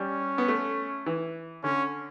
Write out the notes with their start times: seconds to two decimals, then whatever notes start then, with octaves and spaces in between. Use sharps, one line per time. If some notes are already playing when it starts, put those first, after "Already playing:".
Already playing: G3 C#4
0.38 B3
0.48 A3
1.06 E3
1.63 D3 C#4